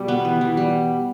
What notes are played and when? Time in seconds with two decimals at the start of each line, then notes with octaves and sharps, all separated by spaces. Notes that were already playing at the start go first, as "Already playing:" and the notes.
Already playing: B2 G3
0.08 B3
0.25 E3
0.41 E3
0.57 G3